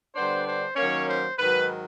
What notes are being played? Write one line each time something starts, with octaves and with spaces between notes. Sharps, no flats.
D3 G3 B3 D4 C5
C5
D#3 F#3 A#3 C#4 C#5
C5
G#2 D#3 F#3 B4